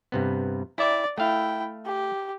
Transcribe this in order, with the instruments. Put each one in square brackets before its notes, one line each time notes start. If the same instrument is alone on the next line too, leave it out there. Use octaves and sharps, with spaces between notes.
[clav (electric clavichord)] G2 C3 B3
[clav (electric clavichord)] E4 E5 G5 [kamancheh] D5
[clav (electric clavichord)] A3 F5 [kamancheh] E4 G5
[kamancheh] G4